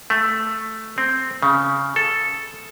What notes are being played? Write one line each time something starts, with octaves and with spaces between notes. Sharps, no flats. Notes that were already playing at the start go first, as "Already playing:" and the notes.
A3
C4
C#3
A4